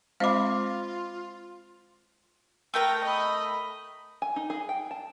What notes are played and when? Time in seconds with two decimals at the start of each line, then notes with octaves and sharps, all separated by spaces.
0.20 G#3 C4 F4 C5 D#5 F5 B5 D6
2.74 A3 A#4 G5 A#5
3.04 D#5 B5
4.22 G#5
4.36 D#4
4.50 G#4
4.69 G5
4.91 A5